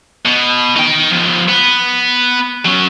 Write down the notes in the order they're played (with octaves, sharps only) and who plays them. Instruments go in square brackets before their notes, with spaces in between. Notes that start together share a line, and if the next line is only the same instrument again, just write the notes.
[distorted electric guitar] B2
D#4 G5
F3 B3
B3
F#3 C#4